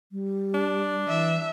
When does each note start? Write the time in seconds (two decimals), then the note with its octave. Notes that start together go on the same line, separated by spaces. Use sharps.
0.12 G3
0.54 D4
1.08 E3 E5